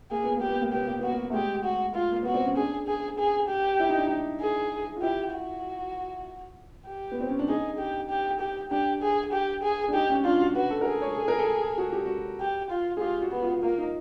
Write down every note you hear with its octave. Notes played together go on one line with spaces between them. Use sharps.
A#3 G#4
B3
A#3 G4
B3
A#3
B3 G4
A#3
B3 F#4
A#3
A3
G#3 G4
F#4
F4
A#3
B3 F#4
C4
C#4
D4 G#4
G#4
G#4
G4
E4
D#4
D4
D#4
G#4
F4
E4 G4
F#4
G4
B3
C4
C#4
D4
D#4 G#4
G4
G4
G4
D4 G4
G#4
G4
G#4
D4
D#4 G4
C#4
D4 F4
F#4
F#4 B4
A4
A#4
G#4 A4
C#5
A4
A#4
A4
F#4
G4
F#4
G4
F4
G#4
F4 G4
F#4
B3
F4
A#3 F4
D#4